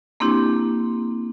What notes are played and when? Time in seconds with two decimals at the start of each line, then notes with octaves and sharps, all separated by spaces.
0.20 A#3 C4 D4 E4 G4